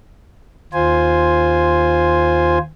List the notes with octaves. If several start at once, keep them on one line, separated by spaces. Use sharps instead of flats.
D#2 F4 C5 G#5